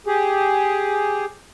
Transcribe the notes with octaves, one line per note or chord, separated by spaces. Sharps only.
G4 G#4